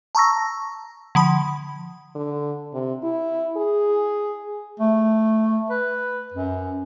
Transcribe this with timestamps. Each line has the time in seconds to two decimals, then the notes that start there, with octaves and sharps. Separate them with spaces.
0.15 A5 A#5 C#6 E6 A#6
1.15 D3 F3 B5
2.15 D3
2.74 C3
3.03 E4
3.57 G#4
4.79 A3
5.70 B4
6.34 F#2